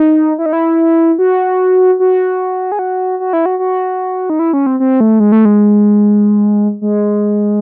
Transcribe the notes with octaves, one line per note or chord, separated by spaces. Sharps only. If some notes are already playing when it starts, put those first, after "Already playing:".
Already playing: D#4
E4
D#4
E4
F#4
F#4
G#4
F#4
F#4
E4
F#4
F#4
D#4
E4
C#4
C4
C4
A3
G#3
A3
G#3
G#3